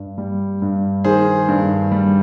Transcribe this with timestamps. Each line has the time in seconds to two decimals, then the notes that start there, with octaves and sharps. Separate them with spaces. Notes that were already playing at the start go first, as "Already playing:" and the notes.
Already playing: G2
0.18 G3
0.62 G2
1.04 D#3 G#4 C5
1.48 G2
1.92 G3